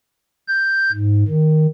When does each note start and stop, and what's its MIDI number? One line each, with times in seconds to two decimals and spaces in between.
0.48 0.91 91
0.92 1.24 44
1.28 1.67 51